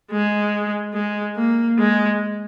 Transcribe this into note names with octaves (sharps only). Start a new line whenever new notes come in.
G#3
G#3
A#3
G#3